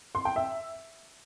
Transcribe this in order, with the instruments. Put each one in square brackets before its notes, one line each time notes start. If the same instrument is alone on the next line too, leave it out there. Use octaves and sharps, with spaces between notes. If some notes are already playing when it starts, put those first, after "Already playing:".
[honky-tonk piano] C6
G5
E5